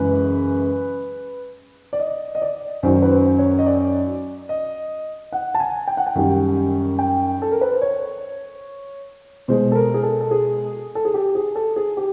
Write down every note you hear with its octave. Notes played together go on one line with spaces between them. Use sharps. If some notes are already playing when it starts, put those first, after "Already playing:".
Already playing: F#2 C#3 E3 G#3 B4
D5
D#5
D#5
D5
F#2 D#3 F#3 C5
B4
C5
C#5
D#5
D5
D#5
F#5
A5
G#5
G5
F#5
G5
F#2 D#3 G3
G5
A4
A#4
B4
C5
C#5
B2 G#3 C5
A4
A#4
G#4
A4
A4
G#4
A4
G#4
G4
G#4
A4
G#4
G4